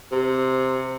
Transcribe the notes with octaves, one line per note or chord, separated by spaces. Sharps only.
C3